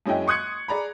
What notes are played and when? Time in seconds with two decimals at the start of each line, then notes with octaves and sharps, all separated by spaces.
0.06 F#2 G#3 C#4 E4 D#5 G5
0.27 C6 C#6 D#6 F#6 G#6 C#7
0.68 G#4 D5 A#5 B5